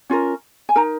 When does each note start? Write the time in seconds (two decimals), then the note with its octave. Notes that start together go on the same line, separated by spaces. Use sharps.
0.10 C#4 F4 A#4
0.69 G#5
0.76 D#4 A#4 A#5